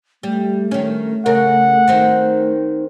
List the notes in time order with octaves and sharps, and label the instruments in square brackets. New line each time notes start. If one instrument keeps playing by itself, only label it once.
[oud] G3 [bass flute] A3
[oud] D#3 C#4
[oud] C#3 A#4 [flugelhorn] F#5
[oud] D#3 C4 D#4